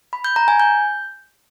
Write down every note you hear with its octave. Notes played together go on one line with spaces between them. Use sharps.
B5
G6
A#5
G#5
G6